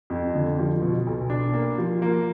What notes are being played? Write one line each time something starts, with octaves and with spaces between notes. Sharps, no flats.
F2
D3
F3
B2
B1
D4
A#3
F3
A#3